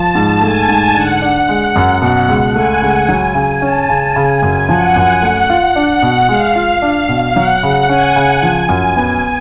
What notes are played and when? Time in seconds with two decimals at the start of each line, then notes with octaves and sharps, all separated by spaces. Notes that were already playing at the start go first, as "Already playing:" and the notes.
Already playing: F3 A5
0.15 G#2
0.41 A3 G#5
0.69 G#2
0.94 D3 F#5
1.22 D4
1.49 G#3
1.76 F#2
2.02 B2
2.28 C#2
2.55 A3 G#5
2.82 C#2
3.09 F#3
3.35 C#3
3.62 C#4 A5
3.89 C#3
4.15 C#3 G#5
4.42 F#2
4.68 F3 F#5
4.96 F#2
5.22 A3
5.50 F4
5.76 D4
6.02 B2
6.29 G#3 F5
6.55 F4
6.82 D4
7.09 B2
7.36 F#3 F#5
7.63 C#3
7.89 C#4 G#5
8.16 C#3
8.42 F3 G#5
8.69 F#2
8.97 B3